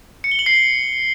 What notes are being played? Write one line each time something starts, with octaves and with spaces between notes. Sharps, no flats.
C#7
G7
F#7
C7